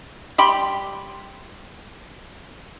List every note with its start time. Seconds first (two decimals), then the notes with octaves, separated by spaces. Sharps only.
0.38 G3 G4 B5 C6